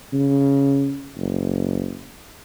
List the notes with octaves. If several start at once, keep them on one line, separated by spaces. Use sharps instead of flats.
C#3
F#1